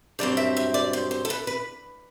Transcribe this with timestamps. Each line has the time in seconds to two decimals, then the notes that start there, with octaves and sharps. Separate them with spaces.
0.19 G2 F#3 C4 D5
0.37 E5
0.57 E5
0.74 D5
0.93 C5
1.11 C5
1.25 A4
1.30 B4
1.47 B4